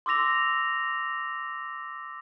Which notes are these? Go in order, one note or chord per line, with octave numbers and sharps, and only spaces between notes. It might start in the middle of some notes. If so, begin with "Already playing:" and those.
C6 D6 E6 A#6 F7